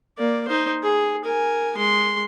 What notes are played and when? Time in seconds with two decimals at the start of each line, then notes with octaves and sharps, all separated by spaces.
0.18 A#3 D5
0.48 D#4 C5
0.83 G#4
1.24 A#4 G#5
1.76 G#3 C6